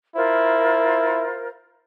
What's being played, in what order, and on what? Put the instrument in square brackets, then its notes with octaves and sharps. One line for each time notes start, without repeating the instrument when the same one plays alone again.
[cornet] E4 [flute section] F4 A#4 C5